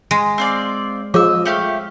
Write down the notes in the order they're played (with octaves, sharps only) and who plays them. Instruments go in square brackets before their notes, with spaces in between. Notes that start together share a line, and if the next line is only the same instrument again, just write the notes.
[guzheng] G#3
[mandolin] C4 F4 D5
[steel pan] F3 [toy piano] G#4 C#5 D6 [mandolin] D#5 E6
[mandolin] A3 G4 F5